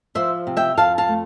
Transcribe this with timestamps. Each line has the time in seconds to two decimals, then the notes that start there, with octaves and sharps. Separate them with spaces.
0.15 F3 C5 E5
0.47 C3
0.57 E5 G5
0.78 F2 F5 A5
0.98 F5 A5
1.08 A3